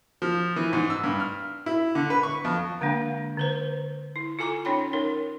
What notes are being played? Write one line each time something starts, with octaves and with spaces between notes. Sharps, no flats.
F3
E3
G#2
E6
G2
F6
E4
D3
B4
C#6
F2
D3 G#3 A#3 D4 G5
D3 B4 C5
E4
F4 A4 G#5 A#5 D6
C#4 D#4 C#5 G5 B5
D#4 A#4 C#5